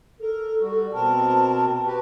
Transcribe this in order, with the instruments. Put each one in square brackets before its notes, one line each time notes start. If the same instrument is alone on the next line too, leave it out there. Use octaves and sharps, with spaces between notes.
[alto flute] A4 [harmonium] A#4
[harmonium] G3 F#4
[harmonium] B2 C4 A#4 [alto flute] A5
[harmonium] F#4 G4 B4